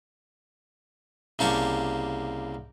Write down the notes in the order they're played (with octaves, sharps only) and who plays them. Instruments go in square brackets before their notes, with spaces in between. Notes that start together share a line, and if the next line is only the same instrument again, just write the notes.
[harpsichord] C2 C#3 A#3 G4 A5 C#6